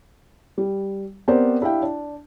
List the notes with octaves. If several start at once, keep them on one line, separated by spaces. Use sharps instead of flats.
G3
B3 C4 G4 A#4 C5 D5
D4 E4 G4 E5 F5 G5
D4